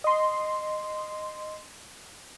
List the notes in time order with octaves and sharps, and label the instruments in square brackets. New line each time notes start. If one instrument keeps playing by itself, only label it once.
[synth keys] D#5 C6